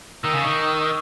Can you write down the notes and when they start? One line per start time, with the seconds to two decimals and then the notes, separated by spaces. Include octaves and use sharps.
0.23 D#3 E6
0.33 C#3 D#6
0.41 D#3 C#6
0.51 D#6
0.59 C#6